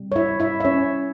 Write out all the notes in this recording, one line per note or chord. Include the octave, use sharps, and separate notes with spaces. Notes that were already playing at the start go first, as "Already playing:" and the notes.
Already playing: C3 G3
C#5
E4 E5
E4 E5
E5
C#4 C#5